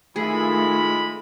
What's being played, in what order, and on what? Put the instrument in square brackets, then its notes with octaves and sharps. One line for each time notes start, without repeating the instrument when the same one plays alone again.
[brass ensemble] D#3 F4 [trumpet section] G#3 E4 B5 [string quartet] A3 [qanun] G#4